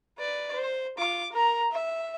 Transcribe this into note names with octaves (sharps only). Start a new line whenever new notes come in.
B4 D5
C5
F4 D6
A#4 A#5
E5